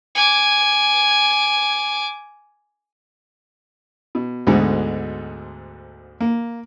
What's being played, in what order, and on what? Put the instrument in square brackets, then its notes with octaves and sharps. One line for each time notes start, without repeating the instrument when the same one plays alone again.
[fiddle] G#5 D6
[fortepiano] B2
D2 G#2 B2 D3 G#3 A3
A#3